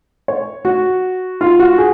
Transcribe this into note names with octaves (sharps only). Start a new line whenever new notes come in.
C#5
F#4
F4
F#4
G#4